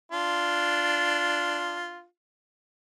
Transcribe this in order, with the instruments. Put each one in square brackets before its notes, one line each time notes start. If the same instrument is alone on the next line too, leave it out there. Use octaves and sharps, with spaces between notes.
[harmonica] D4 F4